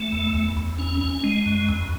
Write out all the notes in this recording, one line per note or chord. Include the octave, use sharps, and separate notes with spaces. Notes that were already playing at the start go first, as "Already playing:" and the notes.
Already playing: A3
E2
E2
E2
C#4
C#4
G#3
F#2
E2